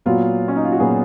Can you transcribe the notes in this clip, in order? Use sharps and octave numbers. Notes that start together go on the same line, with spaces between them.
A#2 F#3 B3 F4
C#4
D#4
F4
F#4
A#2 F#3 B3 G#4